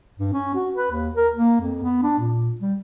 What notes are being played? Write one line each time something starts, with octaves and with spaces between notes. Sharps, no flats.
G2
C#4
F#4
B4
D#2
A#4
A#3
F2
B3
D4
A#2
G3